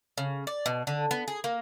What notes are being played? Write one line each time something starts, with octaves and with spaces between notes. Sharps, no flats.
C#3
D5
B2
D3
B3
G#4
A#3